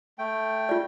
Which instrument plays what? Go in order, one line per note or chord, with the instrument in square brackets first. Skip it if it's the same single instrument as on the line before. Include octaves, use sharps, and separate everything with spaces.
[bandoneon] A3 G5
[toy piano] F4 D5